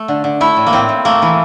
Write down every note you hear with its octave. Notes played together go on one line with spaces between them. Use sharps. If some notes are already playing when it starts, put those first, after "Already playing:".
Already playing: A3
D3
D3
A3 E4
A2
A#3
A2 C4
A2
A3 A#3
E3